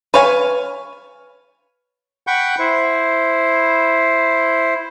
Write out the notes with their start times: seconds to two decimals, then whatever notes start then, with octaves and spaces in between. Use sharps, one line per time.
0.14 B4 C#5 F5 G#5
2.27 F#5 G5 B5 C#6 G6
2.59 E4 C5